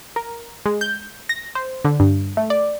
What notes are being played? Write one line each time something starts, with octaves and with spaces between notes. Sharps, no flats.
A#4
G#3
G6
A#6
C5
D3
G2
A3
D5